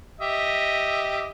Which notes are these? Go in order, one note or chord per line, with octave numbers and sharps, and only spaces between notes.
G4 D#5 E5